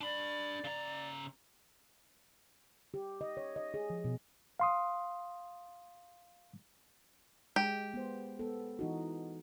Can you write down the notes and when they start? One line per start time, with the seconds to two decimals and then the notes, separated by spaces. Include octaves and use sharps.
0.01 D4 D5 B5
0.64 C#3 A#5
2.94 G4
3.21 D#5
3.37 C#5
3.56 D#5
3.74 G#4
3.90 F3
4.04 B2
4.60 F5 C6 D#6
7.56 G#3 G4
7.94 B3 C5
8.39 B3 A4
8.79 E3 D#4 F#4